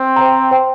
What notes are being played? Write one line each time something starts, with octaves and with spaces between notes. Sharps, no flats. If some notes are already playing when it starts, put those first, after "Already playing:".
Already playing: C4
C5 G5 A#5
C5 G5 C6